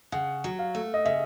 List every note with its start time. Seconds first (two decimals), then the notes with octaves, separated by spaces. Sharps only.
0.12 C#3 F#5
0.44 F#3
0.59 F5
0.75 A3
0.94 D#5
1.05 C#3 E5